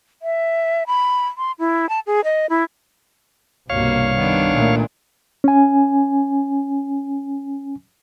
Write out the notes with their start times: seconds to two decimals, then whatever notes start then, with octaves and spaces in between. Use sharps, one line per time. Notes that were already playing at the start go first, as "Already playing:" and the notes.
0.22 E5
0.87 B5
1.37 C6
1.59 E4
1.89 A5
2.07 G#4
2.24 D#5
2.50 E4
3.70 C2 G2 B2 A#3 C#5 F5
4.16 D#3 B3 D4
4.52 A#2 A3
5.44 C#4 G#5